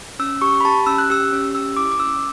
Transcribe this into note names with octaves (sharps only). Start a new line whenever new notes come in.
C#4 E6
G4 C#6
B5
G4 A5
C#4 E6
F#6
G4 E6
C#4
G4 E6
E4 D6
D6
C#4 E6